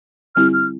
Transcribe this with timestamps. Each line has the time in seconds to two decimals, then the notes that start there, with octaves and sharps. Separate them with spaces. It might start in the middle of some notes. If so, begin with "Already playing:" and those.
0.35 D3 G3 C4 E4 G4 F6
0.53 F6